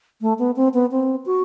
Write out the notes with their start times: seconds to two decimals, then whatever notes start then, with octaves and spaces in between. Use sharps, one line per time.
0.21 A3
0.39 B3
0.56 C4
0.74 B3
0.91 C4
1.26 F#4